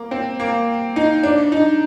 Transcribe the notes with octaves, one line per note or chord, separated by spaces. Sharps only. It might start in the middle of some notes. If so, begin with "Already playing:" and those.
Already playing: A#3
C4
A#3
D#4
D4
D#4